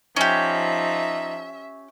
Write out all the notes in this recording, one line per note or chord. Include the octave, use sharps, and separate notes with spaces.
F3 C#4 D#4 G4 E5